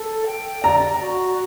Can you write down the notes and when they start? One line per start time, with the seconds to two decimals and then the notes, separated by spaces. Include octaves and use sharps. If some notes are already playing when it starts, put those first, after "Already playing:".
Already playing: A4
0.26 G5
0.64 D5 A#5
1.01 F#4